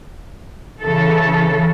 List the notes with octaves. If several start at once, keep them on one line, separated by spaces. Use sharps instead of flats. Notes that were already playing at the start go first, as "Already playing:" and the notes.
C#3 E3 A4